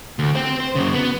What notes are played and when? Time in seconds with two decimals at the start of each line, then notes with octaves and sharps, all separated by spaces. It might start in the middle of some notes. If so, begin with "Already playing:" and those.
0.19 D2
0.36 C5 G5
0.60 C5
0.75 F#2 C#3
0.94 B3